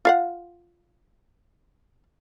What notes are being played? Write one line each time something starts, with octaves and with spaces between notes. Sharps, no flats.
F4 F5 F#5